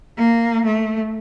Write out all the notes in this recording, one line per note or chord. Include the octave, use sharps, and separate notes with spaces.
A#3
A3